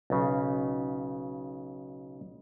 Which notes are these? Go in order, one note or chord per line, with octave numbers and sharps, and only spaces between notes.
B1 C#3